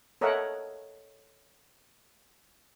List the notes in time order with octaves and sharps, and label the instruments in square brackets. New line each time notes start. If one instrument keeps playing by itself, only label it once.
[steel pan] A4 A#4 C#5 D#5 E5 F#5